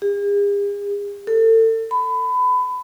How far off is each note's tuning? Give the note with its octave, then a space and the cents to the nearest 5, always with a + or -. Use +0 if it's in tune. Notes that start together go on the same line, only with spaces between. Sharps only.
G#4 -45
A4 +35
B5 +25